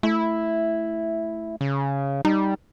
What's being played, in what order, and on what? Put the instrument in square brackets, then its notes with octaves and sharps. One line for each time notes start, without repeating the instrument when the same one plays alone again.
[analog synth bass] A3 [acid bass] E4
[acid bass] C#3
[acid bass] G3 [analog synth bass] D#4